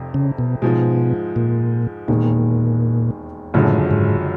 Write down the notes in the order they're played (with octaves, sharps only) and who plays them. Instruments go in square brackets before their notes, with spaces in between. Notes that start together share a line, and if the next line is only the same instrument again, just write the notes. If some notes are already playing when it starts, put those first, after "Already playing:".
Already playing: [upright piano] F1 F2 C3
[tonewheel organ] C#3
B2
[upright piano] G#2 F3 G#3 [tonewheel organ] B2
[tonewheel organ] A#2
[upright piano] E1 D#2 D#3 G#3 [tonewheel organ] A#2
[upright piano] F#1 F#2 D3 F3 G#3 [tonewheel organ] A2
[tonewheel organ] G#2